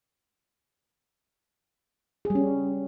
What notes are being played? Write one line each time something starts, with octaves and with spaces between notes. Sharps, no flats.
G#4
G3
C#4